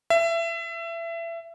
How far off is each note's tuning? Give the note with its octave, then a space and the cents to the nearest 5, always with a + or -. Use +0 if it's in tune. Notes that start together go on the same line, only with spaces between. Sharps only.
E5 +25